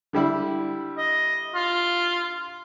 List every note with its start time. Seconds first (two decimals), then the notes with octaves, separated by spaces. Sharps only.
0.13 D3 G3 E4
0.98 D#5
1.55 F4